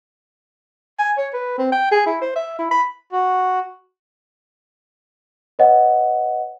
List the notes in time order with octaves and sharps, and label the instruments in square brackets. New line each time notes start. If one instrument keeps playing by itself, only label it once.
[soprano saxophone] G#5
C#5
B4
C4
G5
G#4
E4
C5
E5
E4
B5
[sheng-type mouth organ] F#4
[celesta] B4 C#5 D#5 F#5